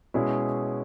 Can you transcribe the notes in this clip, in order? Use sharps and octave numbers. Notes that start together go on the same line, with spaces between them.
B2 G#3 C#4 E4 G#4